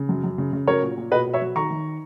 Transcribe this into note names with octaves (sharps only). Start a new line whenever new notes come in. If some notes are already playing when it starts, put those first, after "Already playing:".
Already playing: C#3
F#2
F#2
C#3
C#3
F#3 A#4 C#5
A#2
A#2
B2 B4 D#5
B2
C#5 E5
F#3
D#3 A#5 C#6
D#3